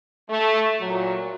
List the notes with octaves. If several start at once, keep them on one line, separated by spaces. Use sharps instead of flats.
A3
A#2 F#3